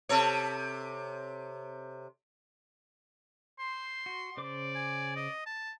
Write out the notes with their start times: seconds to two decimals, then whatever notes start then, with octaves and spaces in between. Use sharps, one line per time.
0.09 C3 A4 C#5
3.59 C5 C6
4.06 F#4
4.37 C#3 C5 D5 D6
4.75 G#5
5.16 D#5
5.46 A5